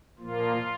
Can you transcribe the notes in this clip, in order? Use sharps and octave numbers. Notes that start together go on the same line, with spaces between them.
A#2 F3 A#3 F4